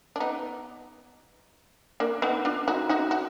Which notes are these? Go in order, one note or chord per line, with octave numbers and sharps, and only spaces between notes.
D4
B3 D#4
A#3 D4
B3 D#4
D4 F4
D#4 F#4
D#4 F#4
F#4